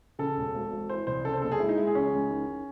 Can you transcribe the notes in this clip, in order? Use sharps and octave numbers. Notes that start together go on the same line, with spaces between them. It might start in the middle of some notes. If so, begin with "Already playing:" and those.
C#3 A4
E1
G#1
G#1
E3 C5
C2 C5
C#3 A4
C5
F#1 A4
G#4
G#3 E4
D#4
G#3 E4
G#4
C#2 C#4
C#2
D#3
D#3